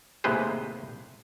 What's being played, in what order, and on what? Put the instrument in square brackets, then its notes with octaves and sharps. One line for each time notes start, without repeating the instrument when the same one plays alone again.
[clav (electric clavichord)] D#2 A2 C3 G#3 B4 C5